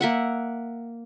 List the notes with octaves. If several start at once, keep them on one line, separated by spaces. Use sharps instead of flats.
A#3 E5 F#5